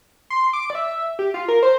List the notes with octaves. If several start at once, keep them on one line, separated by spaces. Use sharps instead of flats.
C6
D6
D5
E5
G4
F4
A#4
C5